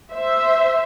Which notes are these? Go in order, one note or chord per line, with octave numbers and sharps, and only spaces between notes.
C5 E5